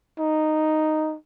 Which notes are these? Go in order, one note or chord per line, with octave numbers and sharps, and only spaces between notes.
D#4